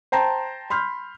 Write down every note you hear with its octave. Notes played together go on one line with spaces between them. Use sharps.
C5 G5 A5 A#5 C6
B5 C6 F6 G6